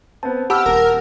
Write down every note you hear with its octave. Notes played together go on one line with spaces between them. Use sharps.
B3 C4 A5
G4 F#5 A5 B5 E6 F6
D#1 A#4